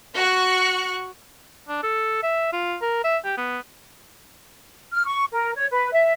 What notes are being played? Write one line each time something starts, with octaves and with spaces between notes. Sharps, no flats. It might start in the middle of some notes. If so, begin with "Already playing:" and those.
F#4 C#6 F#6
D4
A4
E5
F4
A#4
E5
G4
B3
F6
C#6
A#4
C#5
B4
E5